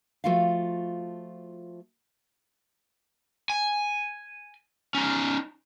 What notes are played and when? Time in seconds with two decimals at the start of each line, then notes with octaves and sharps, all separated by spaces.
0.24 F3 A3 F4 F#4 F5
3.50 G#5
4.94 C#4 D#4